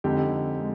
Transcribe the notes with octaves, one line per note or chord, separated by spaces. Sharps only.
F2 D3 G#3 D#4 G4
G#3